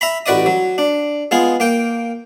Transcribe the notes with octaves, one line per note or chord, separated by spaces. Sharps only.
E5 A#5 B5
A1 F#4 B4 D5 D#5 D#6
F#3
D4
G#3 B3 F4 G#4
A#3 G5